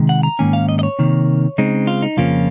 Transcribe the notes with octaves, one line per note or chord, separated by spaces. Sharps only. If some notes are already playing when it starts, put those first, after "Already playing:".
Already playing: C3 D#3 G#3
F#5
A#5
G#2 D#3 A#3 C#4 G#5
F5
D#5
D#5
C#5
C3 D#3 A#3
C#3 G#3 C4 D#4
F4
D#4
F2 C#3 F3 A#3 C#4 F4